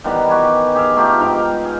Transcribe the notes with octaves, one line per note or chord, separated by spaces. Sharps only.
D#3 E3 G3 B3
F#4 G4 G#5
G4 G#4 E5 F5
A3 D#4 F4 G4
G#2 D#4 F5 G5
G#4